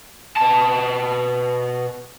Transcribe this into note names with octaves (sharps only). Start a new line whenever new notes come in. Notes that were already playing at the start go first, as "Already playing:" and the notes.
B2 A5